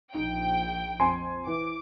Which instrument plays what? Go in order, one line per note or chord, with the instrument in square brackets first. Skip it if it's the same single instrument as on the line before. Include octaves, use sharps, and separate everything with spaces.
[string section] A#1 G5 [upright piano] D#4
[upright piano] F2 G#5 C6
[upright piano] E3 [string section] D6